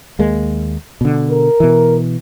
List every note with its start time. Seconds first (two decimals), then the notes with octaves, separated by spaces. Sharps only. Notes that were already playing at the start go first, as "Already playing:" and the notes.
0.19 D#2 G#3 A#3
1.01 B2 D3
1.29 A#4
1.60 B2 E3